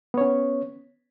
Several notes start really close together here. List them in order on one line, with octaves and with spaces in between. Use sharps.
B3 C#5 C#4